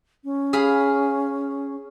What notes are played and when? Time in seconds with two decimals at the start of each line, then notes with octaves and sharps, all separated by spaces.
0.24 C#4
0.53 G#4 F5 B5